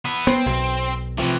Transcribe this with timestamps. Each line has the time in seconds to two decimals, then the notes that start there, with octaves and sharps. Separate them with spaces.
0.05 B3 E4
0.27 B3 C4 C5
0.46 B1
1.18 A2 C3 E3 F3